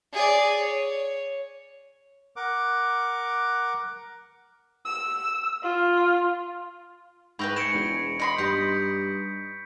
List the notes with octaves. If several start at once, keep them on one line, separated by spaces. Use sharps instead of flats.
G#4 D5
C#5
A#4 F#5 D6
E6
F4
G#2 E4 G4 B4 B5 C#6 A#6
G#4 C#7 D7 E7
E1
D#5 B5 C6
G2 D#4 D#6 G6 B6